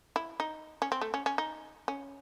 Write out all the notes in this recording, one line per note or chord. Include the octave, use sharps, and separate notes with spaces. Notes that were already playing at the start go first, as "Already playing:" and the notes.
E4
D#4
C#4
C4
A3
C#4
C#4
D#4
C#4